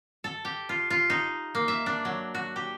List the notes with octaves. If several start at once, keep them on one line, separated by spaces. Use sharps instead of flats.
A4
G4
F4
F4
D#4
A#3
E5
D4
F#3
F#4
G4